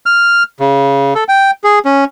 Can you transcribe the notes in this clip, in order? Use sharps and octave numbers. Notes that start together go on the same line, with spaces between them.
F6
C#3
A4
G5
G#4
C#4